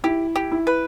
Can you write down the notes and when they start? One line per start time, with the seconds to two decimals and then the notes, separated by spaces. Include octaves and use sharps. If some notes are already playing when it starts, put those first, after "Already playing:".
0.04 E4 G4
0.36 G4
0.52 E4
0.67 B4